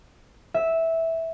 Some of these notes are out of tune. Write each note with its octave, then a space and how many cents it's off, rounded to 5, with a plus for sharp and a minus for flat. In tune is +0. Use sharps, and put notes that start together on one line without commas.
E5 -10